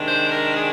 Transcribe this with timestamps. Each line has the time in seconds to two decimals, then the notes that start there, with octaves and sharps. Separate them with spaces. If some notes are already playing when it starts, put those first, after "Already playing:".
Already playing: C3 D#3 G#3 D4
0.08 C5
0.32 A#4
0.57 G#4